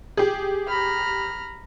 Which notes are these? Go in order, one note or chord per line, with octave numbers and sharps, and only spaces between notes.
G4 G#4
A#5 B5 F6